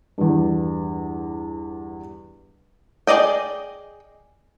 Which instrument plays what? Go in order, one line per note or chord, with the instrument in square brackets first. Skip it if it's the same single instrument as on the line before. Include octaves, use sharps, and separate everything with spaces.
[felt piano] E2 G2
[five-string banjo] G#4 A4 D5 D#5 G5